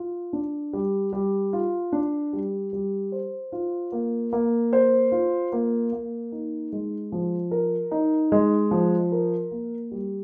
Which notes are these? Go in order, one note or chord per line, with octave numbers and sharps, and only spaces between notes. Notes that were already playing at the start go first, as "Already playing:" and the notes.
Already playing: F4
D4
G3
G3
F4
D4
G3
G3
C5
F4
A#3
A#3
C5
F4
A#3
A#3
D#4
G#3
F3
A#4
D#4
G#3
F3
A#4
A#3
G3